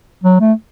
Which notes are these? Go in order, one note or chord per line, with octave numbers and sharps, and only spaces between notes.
F#3
A3